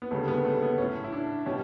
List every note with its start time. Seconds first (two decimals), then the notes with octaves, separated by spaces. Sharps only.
0.02 B3
0.11 D2 C#3 G3 A3
0.28 B3
0.45 A3
0.62 B3
0.78 A2 F#3 C#4
1.04 E4
1.12 D4
1.46 B2 G3 C#4